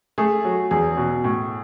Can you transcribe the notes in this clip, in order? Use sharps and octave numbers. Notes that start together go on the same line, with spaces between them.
A3 G#4
F#3
E2 G#4
B2
A2